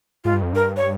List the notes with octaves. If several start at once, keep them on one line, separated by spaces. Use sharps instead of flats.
G#2 F4
G2
F2
G2 A#4
C#5